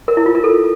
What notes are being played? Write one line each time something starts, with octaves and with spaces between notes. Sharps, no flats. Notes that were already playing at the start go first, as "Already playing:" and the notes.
A#4
E4
F4
A#4
A4